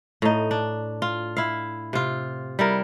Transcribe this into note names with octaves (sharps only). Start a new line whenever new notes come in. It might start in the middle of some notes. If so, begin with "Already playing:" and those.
A2 D#4
D4
F4
E4 F5
C3 F4
G3 E4 A#4